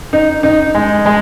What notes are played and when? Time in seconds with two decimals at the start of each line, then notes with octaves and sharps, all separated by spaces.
0.13 D#4
0.43 D#4
0.75 G#3
1.06 G#3